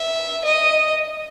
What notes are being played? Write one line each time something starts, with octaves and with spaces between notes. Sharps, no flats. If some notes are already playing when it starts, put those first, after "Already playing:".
Already playing: E5
D#5